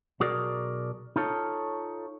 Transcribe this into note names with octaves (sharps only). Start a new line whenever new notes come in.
B1 F#4 G#4 A#4 D5
D#4 F4 A4 C#5